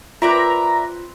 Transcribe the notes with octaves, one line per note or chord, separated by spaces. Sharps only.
C4 F4 A#4 B4 D5 E5 A#5